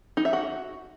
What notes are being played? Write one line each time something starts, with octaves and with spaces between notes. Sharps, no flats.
D#4
E5
F#4